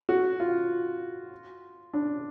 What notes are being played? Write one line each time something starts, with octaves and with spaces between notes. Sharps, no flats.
F#4
F4
D4